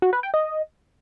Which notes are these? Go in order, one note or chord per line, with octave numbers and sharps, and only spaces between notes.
F#4
B4
G5
D#5